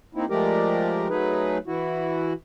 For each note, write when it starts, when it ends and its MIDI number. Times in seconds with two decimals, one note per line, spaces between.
0.15 0.25 58
0.15 0.25 60
0.15 0.25 63
0.15 0.25 64
0.30 1.08 53
0.30 1.08 56
0.30 1.08 57
0.30 1.08 67
0.30 1.08 70
0.30 1.08 74
1.09 1.58 54
1.09 1.58 57
1.09 1.58 63
1.09 1.58 68
1.09 1.58 71
1.67 2.33 52
1.67 2.33 64
1.67 2.33 66